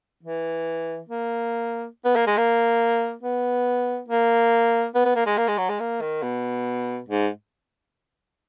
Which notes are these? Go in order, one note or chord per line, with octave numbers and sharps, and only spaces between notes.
E3
A#3
B3
A#3
G#3
A#3
B3
A#3
B3
B3
A#3
G#3
A#3
G#3
F#3
G#3
A#3
D#3
B2
G#2